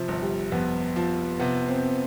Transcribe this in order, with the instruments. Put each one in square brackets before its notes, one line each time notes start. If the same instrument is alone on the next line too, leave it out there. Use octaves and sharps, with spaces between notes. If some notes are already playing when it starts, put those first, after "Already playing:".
Already playing: [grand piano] C3 [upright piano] F3
[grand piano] G1
[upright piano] G3
[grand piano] F2 [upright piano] B3
[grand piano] F3
[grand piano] C3 [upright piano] B3
[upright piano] C4